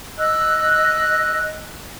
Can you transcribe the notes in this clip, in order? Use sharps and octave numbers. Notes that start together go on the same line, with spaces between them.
D#5 E6 F#6